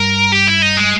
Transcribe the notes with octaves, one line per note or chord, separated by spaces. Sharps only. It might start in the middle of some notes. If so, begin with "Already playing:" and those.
Already playing: G2 A#4
G4
E4
D#4
G#3